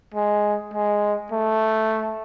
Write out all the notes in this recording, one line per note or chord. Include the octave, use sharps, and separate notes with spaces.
G#3
G#3
A3